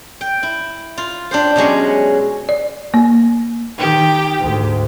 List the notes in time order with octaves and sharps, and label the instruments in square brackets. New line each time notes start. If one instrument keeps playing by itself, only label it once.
[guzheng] G5
E4
F4
D4 G4 C5
B2 F#3 G#3 C#4
[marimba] D5
A#3
[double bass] D#3 [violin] G4 G5
[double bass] D2 G#2